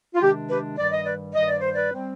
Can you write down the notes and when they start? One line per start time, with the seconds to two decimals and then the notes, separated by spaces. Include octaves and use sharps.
0.15 F4
0.21 C3 D#3 G#3 D4 G4
0.49 G4 B4
0.77 G2 D#3 G3 D5
0.91 D#5
1.04 B4 D5
1.34 G2 D#3 G3 D#5
1.48 D5
1.60 C5
1.74 B4 D5
1.93 G3 C4